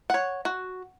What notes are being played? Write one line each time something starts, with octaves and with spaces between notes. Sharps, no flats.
C#5 F#5
F#4